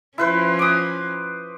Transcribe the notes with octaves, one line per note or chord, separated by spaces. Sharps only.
F3 C#4 E4 B4 C5
D6 D#6